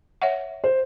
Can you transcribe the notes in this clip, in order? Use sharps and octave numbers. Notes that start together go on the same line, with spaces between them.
C#5 E5 F#5
C5